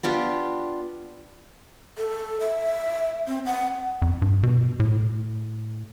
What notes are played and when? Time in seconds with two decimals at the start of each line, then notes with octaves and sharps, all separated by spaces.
0.03 B3 D4 F4 G4
1.98 A4
2.40 E5
3.28 C4
3.46 F#5
4.02 F2
4.22 G2
4.43 B2
4.80 A2